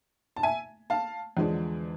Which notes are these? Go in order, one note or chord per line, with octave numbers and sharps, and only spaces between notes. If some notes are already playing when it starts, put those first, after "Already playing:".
A5
E5 G#5
F5 A5
E2 D3 F3 G#3 D4